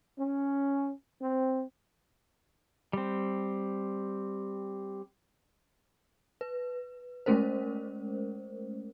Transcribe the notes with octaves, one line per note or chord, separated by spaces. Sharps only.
C#4
C4
G3 C4
B4
G#3 A3 C#4 A#4 C5